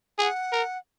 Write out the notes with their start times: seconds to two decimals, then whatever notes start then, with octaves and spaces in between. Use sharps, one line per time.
0.18 G#4 F#5 G#5
0.52 A#4